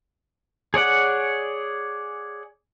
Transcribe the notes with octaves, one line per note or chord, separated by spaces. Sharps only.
G#4 C#5 D5 F#5